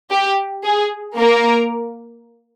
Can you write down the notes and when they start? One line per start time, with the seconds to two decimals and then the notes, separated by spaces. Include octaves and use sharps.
0.11 G4
0.65 G#4
1.19 A#3 A#4